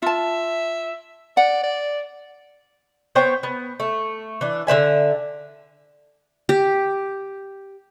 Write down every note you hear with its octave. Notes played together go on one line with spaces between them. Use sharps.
F4 E5 A5
D5 F#5
D5
B3 C5 C#5 G5
B3
A3
E3 D4
D3 B4 E5 G#5
G4